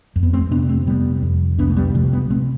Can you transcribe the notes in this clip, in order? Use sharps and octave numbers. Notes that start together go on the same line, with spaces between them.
F2
B3
A3 C4
C3 B3 D4
A3 C4
C3 G3 B3
F2
C2 B3 D4
A3
G3 B3
C3 F3 A3
G3 B3
C3 A3 C4